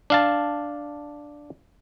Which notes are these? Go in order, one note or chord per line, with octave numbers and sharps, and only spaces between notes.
D4 F5 A5